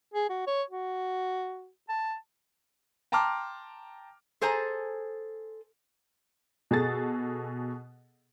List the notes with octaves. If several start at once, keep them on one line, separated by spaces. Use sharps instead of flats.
G#4
F#4
C#5
F#4
A5
G5 A5 A#5 C6 D6 F6
G#4 A4 C5 G#5 A#5
B2 G#4 A4 A6